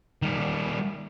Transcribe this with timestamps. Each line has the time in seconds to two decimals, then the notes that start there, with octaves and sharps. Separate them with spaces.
0.22 D#3 G3